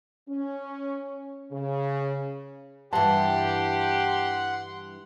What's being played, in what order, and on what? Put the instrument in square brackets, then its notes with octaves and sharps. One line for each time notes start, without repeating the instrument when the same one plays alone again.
[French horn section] C#4
C#3
[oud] G2 E3 [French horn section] G4 [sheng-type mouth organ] F#5 C6 [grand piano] A5